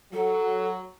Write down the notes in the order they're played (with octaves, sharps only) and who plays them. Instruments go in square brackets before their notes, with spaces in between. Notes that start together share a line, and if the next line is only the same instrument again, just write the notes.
[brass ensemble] F#3 [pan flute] A4